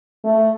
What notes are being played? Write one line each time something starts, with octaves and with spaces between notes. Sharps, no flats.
A3